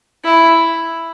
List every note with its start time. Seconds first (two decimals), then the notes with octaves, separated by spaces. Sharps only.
0.24 E4